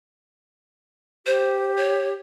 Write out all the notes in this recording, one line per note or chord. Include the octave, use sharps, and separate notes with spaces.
G4 C5
C#5